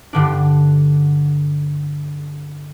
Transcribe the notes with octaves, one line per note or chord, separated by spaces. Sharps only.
G2 D3 D4